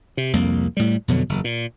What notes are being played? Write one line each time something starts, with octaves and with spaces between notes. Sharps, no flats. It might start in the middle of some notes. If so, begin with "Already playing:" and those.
C3
C2 F2 A#3
A2 G3
F2 B2 D3 F#3
F#1 E2
A#2